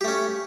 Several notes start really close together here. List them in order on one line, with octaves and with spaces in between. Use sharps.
G4 A3 C#4